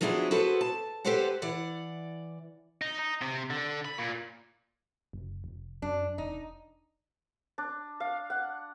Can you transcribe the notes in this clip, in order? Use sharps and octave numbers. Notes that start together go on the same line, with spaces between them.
F3 F#3 B3 D4 E4 G#4
F#4 G#4 A4 B4 C5
A5
G4 A4 B4 C5 D5 F#5
E3 D5 F#5
D#4
D#4
C3
D3
B5
A#2
F#1
F1
F#2 D4
E1 D#4
D4
F5
F#5